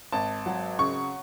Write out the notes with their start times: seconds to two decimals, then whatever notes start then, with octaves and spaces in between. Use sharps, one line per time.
0.12 G#1 A5
0.46 F#3
0.79 C#3 C#6